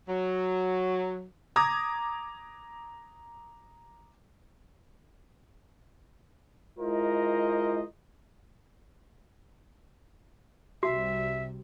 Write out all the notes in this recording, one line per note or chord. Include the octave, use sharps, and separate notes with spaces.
F#3
A#5 D6 D#6 G#6 A#6
G#3 E4 F4 A#4 C5 D#5
C2 C3 G3 F#4 E5